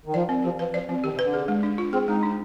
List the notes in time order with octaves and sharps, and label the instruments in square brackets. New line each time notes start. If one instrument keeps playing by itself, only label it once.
[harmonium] D#3
[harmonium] F3 [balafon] D5
[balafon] C4
[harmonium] F3 [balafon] G4
[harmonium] F3 [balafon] B4
[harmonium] F3 [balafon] D5
[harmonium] F3 [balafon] C4
[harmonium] D#3 [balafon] G4
[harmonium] C3
[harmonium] D3 [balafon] B4
[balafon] G#4
G#3
D4
F4
[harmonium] C4 [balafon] G#4
[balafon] G#3 [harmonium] D#4
[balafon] D4